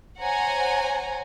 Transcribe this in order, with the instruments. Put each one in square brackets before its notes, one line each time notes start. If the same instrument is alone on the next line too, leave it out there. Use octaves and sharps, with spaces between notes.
[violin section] C5 C#5 F#5 G#5 A#5